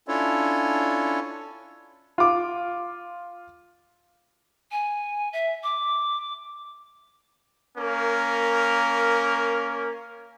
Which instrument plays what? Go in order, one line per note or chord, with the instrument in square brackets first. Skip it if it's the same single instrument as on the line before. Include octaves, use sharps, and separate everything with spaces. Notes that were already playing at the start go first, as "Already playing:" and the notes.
[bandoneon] C#4 D4 E4 F4 A4 C#5
[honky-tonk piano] F4 D6
[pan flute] G#5
E5
D6
[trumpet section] A#3 C#4 A#4